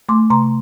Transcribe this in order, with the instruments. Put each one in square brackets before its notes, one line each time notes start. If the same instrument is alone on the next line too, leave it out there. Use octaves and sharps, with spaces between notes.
[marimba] A3 C6 D6
C3 A#5 C6